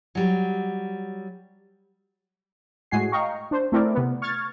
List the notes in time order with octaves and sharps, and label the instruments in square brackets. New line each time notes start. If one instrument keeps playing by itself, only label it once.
[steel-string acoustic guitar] F#3 G3
[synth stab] A2 G#3 F#4 G#5 C7
D#5 F5 G5 A#5 C#6
D4 C5
A3 C4 E4 A#4 D5
C3 B3
C#6 F6 G#6 A6